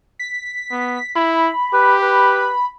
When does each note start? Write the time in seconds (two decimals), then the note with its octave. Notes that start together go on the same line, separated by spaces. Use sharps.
0.19 B6
0.71 B3
1.16 E4 B5
1.74 G4 B4
2.02 B4